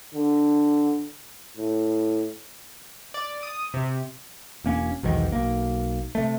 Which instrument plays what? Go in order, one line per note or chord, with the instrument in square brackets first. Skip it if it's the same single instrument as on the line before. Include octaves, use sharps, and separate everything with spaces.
[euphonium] D3
A2
[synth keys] D5
D#6
C3
[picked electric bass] E1 A#3 C#4
B1 E2 G#2 D#3
B1 A#3
C3 A3